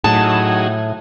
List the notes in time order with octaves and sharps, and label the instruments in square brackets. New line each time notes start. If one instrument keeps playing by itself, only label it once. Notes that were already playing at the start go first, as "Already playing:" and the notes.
[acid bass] A2 [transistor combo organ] F#3 D#4 G#4 [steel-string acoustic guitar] A5